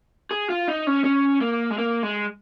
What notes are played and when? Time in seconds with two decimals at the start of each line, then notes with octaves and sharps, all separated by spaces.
0.31 G#4
0.50 F4
0.68 D#4
0.87 C#4
1.04 C#4
1.41 A#3
1.70 G#3
1.78 A#3
2.03 G#3